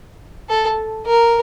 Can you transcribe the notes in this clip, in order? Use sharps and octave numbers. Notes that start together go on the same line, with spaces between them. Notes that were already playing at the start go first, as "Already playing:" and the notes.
A4
A#4